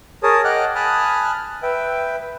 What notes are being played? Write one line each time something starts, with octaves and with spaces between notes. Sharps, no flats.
G#4 A#4 C#5 A5 D#6
D#5 F#5 G5 D6 F6 F#6
G#5 A5 B5 D#6 F6 F#6
B4 E5 G5